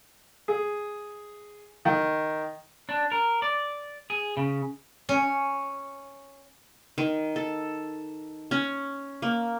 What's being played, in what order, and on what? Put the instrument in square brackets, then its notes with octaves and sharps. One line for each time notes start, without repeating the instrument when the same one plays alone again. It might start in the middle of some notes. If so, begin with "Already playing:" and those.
[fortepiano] G#4
D#3
[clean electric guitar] D4
A#4
D5
G#4
C#3
[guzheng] C#4
[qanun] D#3
A4
C#4
A#3